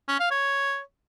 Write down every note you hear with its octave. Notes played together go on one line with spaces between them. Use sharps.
C#4
F5
C#5